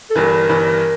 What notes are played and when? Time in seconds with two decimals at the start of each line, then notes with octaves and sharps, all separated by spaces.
0.10 A4
0.15 G1 G2 E3 A#4
0.49 G1 G2 E3